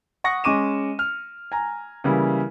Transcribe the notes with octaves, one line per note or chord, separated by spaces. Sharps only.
F#5 C#6 D#6 A#6 C#7
G#3 C#4 C#6 D6 D#7 E7
F6
G#5 A#5
C#3 E3 G3 A#3 E4